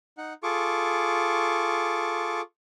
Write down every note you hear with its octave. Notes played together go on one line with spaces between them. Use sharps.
D#4 F#5
F4 G#4 A4 C#6 D6